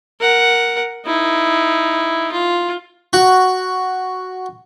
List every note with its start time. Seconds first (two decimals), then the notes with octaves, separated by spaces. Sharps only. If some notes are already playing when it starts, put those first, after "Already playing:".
0.20 A#4 F#5
1.06 D#4 E4
2.32 F4
3.13 F#4